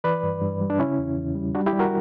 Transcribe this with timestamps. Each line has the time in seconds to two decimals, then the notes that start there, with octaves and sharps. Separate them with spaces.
0.04 E3 B4 D5
0.23 G2
0.42 G2
0.61 G3
0.70 D4
0.79 C#3 C#4 E4
0.99 E2
1.17 E2
1.35 G3
1.55 G3 D4 F#4
1.66 E4 G4
1.73 G3
1.79 F#4 A#4